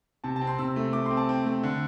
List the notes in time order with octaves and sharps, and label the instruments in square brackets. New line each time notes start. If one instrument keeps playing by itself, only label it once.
[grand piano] C3 A5
A5
C4
C6
C3 E6
A3
A3 D6
C4 C6
A5
C4
A3
D3